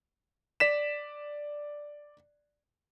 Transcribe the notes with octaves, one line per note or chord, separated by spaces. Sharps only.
D5 B6 E7